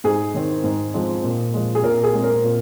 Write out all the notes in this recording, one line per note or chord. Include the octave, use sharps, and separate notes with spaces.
G#2 G#4
D#3 C4
G#2
F3 G#3 C4
A#2
F3 G#3
G#4
A#2 A#4
G#4
G#3 C4
A#4
A#2